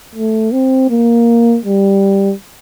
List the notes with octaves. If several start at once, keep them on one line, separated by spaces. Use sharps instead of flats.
A3
C4
A#3
G3